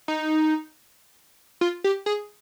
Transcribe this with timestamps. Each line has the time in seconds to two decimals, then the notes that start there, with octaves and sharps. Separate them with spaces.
0.08 D#4
1.61 F4
1.84 G4
2.06 G#4